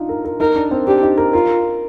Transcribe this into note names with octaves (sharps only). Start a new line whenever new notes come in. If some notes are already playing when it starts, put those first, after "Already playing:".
Already playing: D4 D#4 F4
A#4
A#4
D#4 A#4
D4
C4
D4 G4
D#4
A#4
F4 A#4